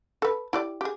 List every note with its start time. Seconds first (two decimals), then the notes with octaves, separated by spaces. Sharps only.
0.22 A4 B4
0.53 E4 G4 D5
0.81 G4 G#4